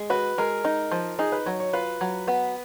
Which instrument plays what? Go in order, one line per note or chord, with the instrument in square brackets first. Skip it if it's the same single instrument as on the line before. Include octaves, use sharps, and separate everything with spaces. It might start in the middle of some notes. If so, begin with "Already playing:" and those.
Already playing: [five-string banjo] G#3
[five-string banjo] F#4 [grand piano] B4
[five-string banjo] G#3 [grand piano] A#4
[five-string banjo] D#4
F3
[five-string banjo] D#4 [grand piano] G#4
[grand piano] B4
[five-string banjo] F#3 [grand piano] C#5
[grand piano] C#5
[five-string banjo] F4 [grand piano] B4
[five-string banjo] F#3
B3